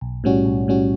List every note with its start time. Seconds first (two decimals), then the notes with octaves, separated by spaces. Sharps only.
0.01 B1
0.24 A2 G3 C#4 F#4
0.45 B1
0.68 A2 G3 C#4 F#4